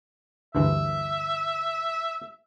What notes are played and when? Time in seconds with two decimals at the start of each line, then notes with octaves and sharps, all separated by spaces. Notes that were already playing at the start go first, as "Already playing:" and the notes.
0.55 D2 G2 E3 E5